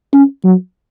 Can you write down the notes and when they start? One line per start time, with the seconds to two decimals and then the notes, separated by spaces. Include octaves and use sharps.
0.13 C#4
0.44 F#3